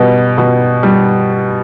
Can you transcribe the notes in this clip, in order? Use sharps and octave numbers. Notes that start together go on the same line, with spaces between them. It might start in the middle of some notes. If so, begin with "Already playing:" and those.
Already playing: B2 G3
B2
G3